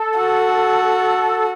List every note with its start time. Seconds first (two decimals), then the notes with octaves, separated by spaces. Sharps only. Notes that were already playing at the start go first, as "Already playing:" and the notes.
Already playing: A4
0.18 F#4